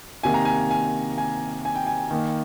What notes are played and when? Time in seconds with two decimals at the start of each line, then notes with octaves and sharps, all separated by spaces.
0.23 C3 D#3 A#3 G#5
0.34 A#5
0.45 G#5
0.71 G#5
1.18 G#5
1.65 G#5
1.75 G5
1.87 G#5
2.11 D#3 A#3